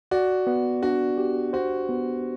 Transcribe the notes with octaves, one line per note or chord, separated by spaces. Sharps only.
F#4 D5
B3
D4 F#4
G4
F#4 C5
B3